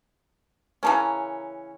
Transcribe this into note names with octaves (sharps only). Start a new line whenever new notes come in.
C#3 E3 C#4 A#4 A5 A#5